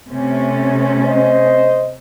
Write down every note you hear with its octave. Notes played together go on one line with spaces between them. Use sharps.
C3 A3 C#4
C5 D#5